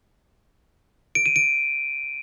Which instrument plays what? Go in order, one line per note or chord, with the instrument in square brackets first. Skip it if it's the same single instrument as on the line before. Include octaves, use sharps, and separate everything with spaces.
[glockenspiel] D7
D#7
D7